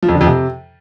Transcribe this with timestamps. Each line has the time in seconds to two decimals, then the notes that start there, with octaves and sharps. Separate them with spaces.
0.03 F3
0.09 F2
0.15 D3
0.21 F2
0.27 C3